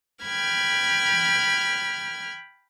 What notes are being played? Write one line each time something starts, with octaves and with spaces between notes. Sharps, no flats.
G5 B5 F6 G#6